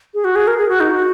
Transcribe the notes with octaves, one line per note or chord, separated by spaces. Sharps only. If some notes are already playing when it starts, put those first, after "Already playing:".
G#4
F#4
G#4
A#4
G#4
F#4
D#4
F#4